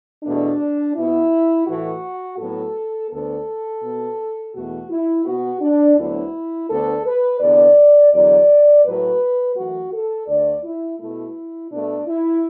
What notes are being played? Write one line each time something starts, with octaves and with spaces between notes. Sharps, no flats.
E2 B2 A3 D4
B2 B3 E4
A2 E3 A3 F#4
A2 F#3 B3 A4
D2 D3 B3 A4
B2 B3
E2 B2 A3 F#4
E4
B2 B3 F#4
D4
D2 D3 F#3 B3 E4
D2 D3 B3 A4
B4
E2 D3 B3 D5
E2 D3 F#3 D5
A2 F#3 A3 B4
F#2 E3 A3 F#4
A4
D2 D3 A3 D5
E4
B2 A3 E4
B2 A3 D4
E4